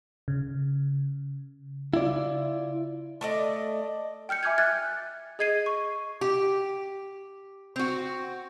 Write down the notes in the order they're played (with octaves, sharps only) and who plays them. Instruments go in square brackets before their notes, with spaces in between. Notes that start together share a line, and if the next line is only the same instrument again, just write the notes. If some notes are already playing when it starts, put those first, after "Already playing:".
[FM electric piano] C#3
[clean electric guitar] E4 F4 D5
[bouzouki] A3 D5 D#5
[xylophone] G5 F6 G6 C#7
E5 G#5 D6 F6 G6 G#6
F6 F#6 G#6 A6
G#4 D#5 G#6 C7 D#7
C#6
[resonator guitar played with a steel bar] G4
C4 F#4